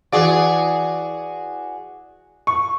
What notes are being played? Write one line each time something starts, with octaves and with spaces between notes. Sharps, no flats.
E3 F#4 G#4 D5
C#6